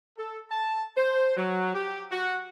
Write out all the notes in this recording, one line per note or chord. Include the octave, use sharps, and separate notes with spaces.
A4
A5
C5
F#3
G4
F#4